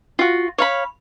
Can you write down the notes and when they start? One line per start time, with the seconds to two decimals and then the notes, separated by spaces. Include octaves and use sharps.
0.19 F4 F#4
0.58 C#5 F5 B5